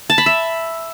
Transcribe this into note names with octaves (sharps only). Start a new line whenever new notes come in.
A5
B5
E5